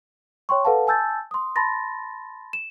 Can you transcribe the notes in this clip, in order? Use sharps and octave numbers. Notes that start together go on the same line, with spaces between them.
C#5 G5 C6 C#6
A4 B4 F5 F#5 A5
G#5 A5 E6 G6 A6
C6 D#6
A5 B5 C6 A6 A#6
E7